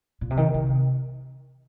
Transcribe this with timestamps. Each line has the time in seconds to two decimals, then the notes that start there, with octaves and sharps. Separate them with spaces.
0.21 A#2
0.30 C3
0.37 D#3
0.54 C3